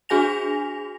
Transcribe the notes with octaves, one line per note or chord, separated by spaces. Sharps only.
D4 F#4 G#4 G#5 A#6 F7